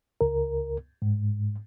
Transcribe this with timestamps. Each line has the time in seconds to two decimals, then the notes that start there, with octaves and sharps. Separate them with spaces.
0.21 C#2 A#4
1.02 G#2